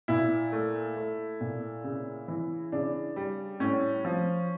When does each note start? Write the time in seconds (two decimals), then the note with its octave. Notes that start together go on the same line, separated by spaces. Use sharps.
0.08 A#2 E4
0.52 A3
0.97 A3
1.41 A#2
1.84 C#3
2.28 E3
2.72 C#3 D4
3.16 G3
3.60 A2 C#4
4.05 F3